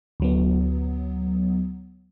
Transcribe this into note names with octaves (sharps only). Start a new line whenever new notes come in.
D2 F#3 B3